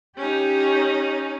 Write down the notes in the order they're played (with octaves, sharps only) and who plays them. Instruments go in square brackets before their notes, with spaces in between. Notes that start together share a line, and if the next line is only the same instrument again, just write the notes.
[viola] C#4 D#4 [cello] G4